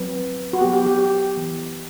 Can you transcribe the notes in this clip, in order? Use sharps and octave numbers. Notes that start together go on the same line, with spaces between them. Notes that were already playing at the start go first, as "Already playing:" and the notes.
Already playing: F#3 C4 B4
F#4
F#3 B3 G4
G4
G4
G4
E3 B3